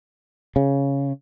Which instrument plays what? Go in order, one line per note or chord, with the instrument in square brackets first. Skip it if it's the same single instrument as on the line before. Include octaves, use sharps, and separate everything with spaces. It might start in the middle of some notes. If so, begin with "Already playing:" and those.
[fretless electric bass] C#3